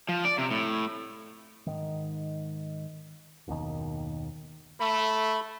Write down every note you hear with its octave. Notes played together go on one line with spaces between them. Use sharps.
F3
D5
C3
A2
G#2 D#3
F#1 D#2 B2 D#3
A3 B5